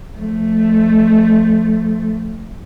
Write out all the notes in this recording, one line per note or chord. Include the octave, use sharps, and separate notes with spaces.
F3 A3